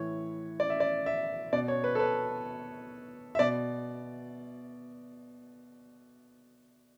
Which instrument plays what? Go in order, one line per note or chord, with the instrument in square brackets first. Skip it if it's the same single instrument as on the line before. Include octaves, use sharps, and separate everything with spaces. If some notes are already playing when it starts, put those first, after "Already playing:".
Already playing: [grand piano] A2 E3 C#5
D5
E5
D5
E5
B2 D5
C#5
B4
A4
B4
E5
B2 D5